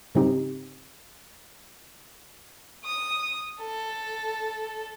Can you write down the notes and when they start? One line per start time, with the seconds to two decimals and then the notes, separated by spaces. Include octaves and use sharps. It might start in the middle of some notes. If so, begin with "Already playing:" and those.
0.15 G#2 C#3 G3 C4 D#4 G4
2.84 D#6
3.61 A4